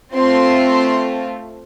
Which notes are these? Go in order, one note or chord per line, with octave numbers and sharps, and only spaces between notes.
A3 C4 F4 C6
C6